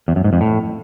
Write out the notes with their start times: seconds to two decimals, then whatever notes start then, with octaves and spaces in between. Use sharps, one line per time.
0.08 E2
0.16 F#2
0.24 G#2
0.33 F2
0.41 A2